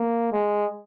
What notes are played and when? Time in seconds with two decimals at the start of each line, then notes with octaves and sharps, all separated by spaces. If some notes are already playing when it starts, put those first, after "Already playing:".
Already playing: A#3
0.32 G#3